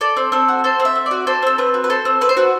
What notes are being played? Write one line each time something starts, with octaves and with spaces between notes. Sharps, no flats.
A4 D5
C4
C4 A4
F#4
A4 C5
C4
E5
C4
D5
F#4
A4 C5
C4 A4
C4 B4
F#4
B4
A4 C5
C4
C4 B4
C5
F#4 B4